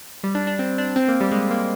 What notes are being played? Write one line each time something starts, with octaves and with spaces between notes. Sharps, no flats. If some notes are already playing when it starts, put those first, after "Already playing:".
G3
D4
D4
C4
D4
C4
A#3
G3
G#3
A#3